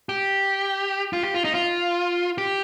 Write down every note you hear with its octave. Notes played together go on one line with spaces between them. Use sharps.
G4
F4
G4
F4
D#4
F4
G4